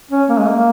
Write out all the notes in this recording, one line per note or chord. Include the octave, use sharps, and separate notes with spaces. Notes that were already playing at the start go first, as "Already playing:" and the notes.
C#4
A#3
G#3
A#3